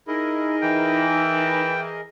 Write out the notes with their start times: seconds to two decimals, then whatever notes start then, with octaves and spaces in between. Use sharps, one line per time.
0.07 D#4 E4 G#4 A#4 D#5
0.61 E3 G5